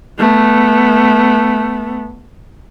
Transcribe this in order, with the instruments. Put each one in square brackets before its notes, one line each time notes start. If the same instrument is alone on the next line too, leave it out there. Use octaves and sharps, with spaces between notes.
[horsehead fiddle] A3 B3